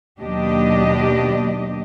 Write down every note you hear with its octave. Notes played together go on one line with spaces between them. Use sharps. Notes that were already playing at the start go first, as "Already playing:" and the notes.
D#2 B2 F#3 D4 G4 D#5